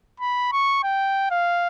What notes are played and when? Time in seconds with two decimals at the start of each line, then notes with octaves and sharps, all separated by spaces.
0.20 B5
0.52 C#6
0.83 G5
1.31 F5